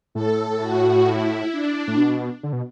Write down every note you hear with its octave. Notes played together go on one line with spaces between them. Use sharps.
A2 A4
F#4
E4
D4
A2
B2
D3
B2